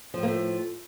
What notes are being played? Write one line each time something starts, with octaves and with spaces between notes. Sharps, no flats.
A2 F3 A3 A#3